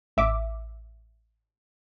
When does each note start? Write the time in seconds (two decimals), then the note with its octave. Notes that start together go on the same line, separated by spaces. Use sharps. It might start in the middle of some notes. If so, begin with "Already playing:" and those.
0.17 A1 E5 D6